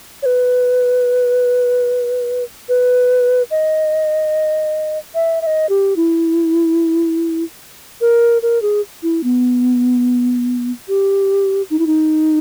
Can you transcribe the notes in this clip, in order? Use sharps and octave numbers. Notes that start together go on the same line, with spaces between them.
C#5
B4
B4
D#5
E5
E5
D#5
G4
E4
A#4
A#4
G#4
E4
B3
G4
D#4
E4
D#4